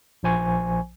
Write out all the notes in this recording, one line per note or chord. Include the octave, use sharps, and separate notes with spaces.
A#1 F3 C5 G#5 C#6